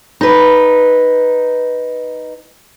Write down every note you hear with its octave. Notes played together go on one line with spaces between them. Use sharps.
D#4 B4